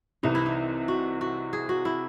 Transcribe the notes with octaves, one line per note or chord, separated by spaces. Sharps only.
C2 C3 E3 D#4
E4
D#4
F#4
F#4
G#4
F#4
E4